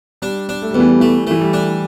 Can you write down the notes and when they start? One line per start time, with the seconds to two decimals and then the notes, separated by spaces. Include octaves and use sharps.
0.22 G3 D4
0.49 D4
0.62 A3
0.71 E2 G3
0.80 E3
0.88 G3
1.00 E3 A3
1.27 E3 A3
1.41 G3
1.53 D4